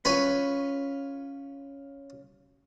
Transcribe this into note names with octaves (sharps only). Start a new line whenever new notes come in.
C#4 F4 B4 C#5 G#5